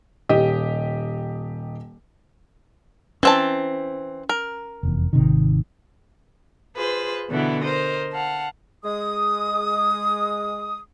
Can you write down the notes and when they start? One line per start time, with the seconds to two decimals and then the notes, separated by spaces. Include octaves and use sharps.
0.29 D#1 G4 D#5
3.23 E3 C4 C#4 A5
4.29 A#4
4.83 F1 E2
5.13 G#1 C3 D#3
6.77 F4 G#4 B4 C5
7.31 B2 D3 E3 B3 E4
7.62 A#4 C5 D#5
8.13 F5 F#5 A5
8.84 G#3 D#6